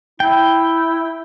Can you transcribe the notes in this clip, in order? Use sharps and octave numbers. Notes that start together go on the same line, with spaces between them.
E4 G5